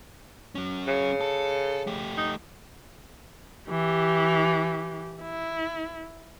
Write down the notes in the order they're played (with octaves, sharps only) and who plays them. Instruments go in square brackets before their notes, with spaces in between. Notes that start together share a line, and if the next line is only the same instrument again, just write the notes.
[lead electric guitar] F#3 C#4
[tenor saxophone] C#3
[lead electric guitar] A4
A3 G4
[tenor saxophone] D#4
[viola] E3 G4
E4